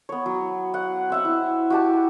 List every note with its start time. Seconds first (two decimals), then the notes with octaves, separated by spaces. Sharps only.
0.09 B3 C#5
0.26 F#3
0.74 F#5
1.10 C4 E5 F#5
1.25 E4
1.70 F#4 G4 A5